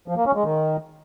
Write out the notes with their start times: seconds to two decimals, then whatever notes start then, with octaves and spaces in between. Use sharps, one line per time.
0.08 F3
0.17 A#3
0.26 C#4
0.35 G#3
0.44 D#3